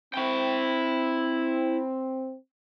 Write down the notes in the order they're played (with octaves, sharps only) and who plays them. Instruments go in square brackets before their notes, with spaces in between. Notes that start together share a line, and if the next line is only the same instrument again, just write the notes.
[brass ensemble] C4 [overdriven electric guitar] E4 G5